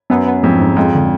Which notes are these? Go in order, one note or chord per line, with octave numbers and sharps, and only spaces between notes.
F#2 B3
B3
F2 G#2
G#2
F2 G#3
D3